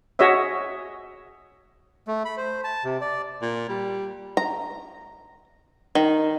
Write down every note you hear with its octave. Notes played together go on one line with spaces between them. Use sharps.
F#4 G#4 C#5 D#5 E5
A3
B5
C5
A5
C3
D5
A#2
G3
A#5
D#3